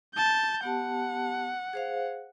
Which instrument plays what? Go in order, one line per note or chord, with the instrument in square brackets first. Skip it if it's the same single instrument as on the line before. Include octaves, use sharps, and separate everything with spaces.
[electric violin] A5 G6
[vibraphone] B3 G4 A5 [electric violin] F#5
[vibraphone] G#4 C5 F5